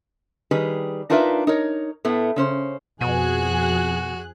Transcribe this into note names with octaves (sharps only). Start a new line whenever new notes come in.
D#3 G3 G#4 B4
D4 D#4 F4 A#4 B4 E5
D#4 A#4 C#5
A2 A3 B3
C#3 C#4 C5
F2 B2 F#4 G#4 F#6